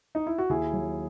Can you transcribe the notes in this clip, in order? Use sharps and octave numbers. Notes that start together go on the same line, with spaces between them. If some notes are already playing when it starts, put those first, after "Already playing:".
D#4
E4
F#4
D#2 E4 G#4
F#3